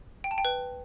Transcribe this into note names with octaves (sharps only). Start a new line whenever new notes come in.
G5
A5
G5
B4